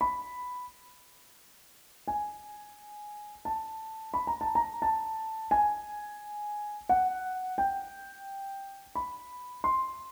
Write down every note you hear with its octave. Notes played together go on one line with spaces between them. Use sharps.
B5
G#5
A5
B5
A#5
A5
A#5
A5
G#5
F#5
G5
B5
C6